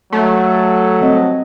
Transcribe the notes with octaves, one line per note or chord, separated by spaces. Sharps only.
F#3 A3
G3 C4 D#5